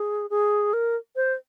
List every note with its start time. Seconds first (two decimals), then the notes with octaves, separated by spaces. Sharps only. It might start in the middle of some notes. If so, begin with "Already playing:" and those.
Already playing: G#4
0.30 G#4
0.73 A#4
1.16 C5